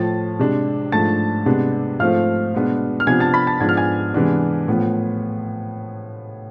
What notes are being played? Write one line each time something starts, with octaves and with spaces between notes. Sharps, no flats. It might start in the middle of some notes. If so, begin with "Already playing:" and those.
Already playing: A2 F3 A3 A5 A6
C3 G#3 D4
G#2 F3 A3 D4 A5 A6
C3 G#3 B3 D4
G#2 F3 A3 C4 F5 F6
B2 G#3 B3 D4
F6
C3 F3 B3 D4 G#5 G#6
A5 A6
B5 B6
A5 A6
G#2 F3 B3 D4 G#6
F6
G#5 G#6
C3 E3 G#3 B3 D4
A2 F3 B3